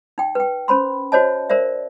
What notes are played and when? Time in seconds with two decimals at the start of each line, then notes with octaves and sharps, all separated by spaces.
0.18 D#4 G5
0.35 B4 G5
0.68 C#4 C5 B5 C6
1.12 F#4 C5 C#5 D#5 A5
1.50 A#4 C5 D5 E5